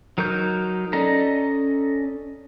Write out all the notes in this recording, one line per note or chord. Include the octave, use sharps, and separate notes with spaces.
F#3 D#4 A#4 C#6 G6
C#4 A4 D5 D#5 A#5